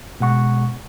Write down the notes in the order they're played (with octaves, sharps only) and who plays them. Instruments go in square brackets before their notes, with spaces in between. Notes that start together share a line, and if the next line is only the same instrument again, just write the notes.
[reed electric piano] B2 G#3 F#5 C#6